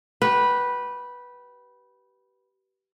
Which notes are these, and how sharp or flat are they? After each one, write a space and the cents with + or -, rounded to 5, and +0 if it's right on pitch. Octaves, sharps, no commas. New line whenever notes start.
G4 -35 B4 -10